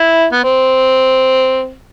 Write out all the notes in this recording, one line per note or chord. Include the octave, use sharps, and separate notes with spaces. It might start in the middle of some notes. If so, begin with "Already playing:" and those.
Already playing: E4
B3
C4